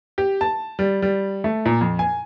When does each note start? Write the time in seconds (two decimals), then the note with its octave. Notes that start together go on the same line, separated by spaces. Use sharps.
0.18 G4
0.41 A5
0.79 G3
1.02 G3
1.44 A3
1.66 A#2
1.81 F2
1.99 G#5